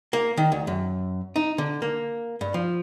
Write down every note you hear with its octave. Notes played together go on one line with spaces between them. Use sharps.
A#3
D#3
D2
F#2
D#4
D3
A#3
G2
F3